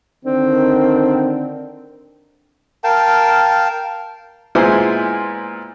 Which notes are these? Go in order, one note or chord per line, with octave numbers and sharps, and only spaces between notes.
D3 D#3 C4
A#4 F5 G5 A5
A#2 G#3 B3 E4 C5 G#5